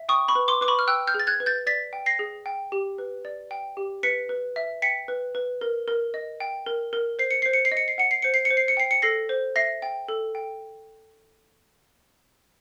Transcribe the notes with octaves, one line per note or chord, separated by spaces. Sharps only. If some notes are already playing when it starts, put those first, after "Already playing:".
Already playing: E5
G5 C#6 D#6
B5 C#6
B4
C6 D6
B4 D6
B5 C#6
F6
G5 E6 F#6
F6 G6
G#4
A6
F#6 G#6
B4
G6 A6
D5 A6 B6
G5
A#6 C7
G#4
G5
G4
B4
D5
G5
G4
B4 B6 C#7
B4
E5
G5 B6 C#7
B4
B4
A#4
A#4
D#5
G5
A#4
A#4
C5 C7
C#7
C5 C7
C#7
C7
D#5
C#7
C7
F#5 C#7
C7
C5 C#7
C7
C#7
C5
C7
C#7
G5 C7
C#7
A4 A#6 C7
C5
E5 A#6 C7
G5
A4
G5